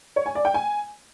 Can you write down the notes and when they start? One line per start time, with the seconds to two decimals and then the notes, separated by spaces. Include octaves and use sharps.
0.16 C#5
0.26 G#5
0.35 D5
0.45 G5
0.54 G#5